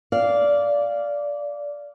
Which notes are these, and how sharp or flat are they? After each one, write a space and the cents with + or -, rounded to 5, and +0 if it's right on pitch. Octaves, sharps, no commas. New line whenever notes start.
D5 -15 F5 -5